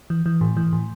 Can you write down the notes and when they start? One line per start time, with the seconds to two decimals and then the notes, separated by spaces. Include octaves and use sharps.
0.10 E3
0.26 E3
0.41 A2
0.57 E3
0.73 A2